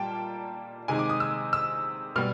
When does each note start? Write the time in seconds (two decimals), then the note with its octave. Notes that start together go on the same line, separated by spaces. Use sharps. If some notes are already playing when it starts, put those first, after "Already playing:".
Already playing: A#2 G3 A#3 G5 A5
0.88 C3 D#3 G#3 G#5
0.99 D6
1.10 D#6
1.20 E6
1.53 E6
2.16 B2 G3 F6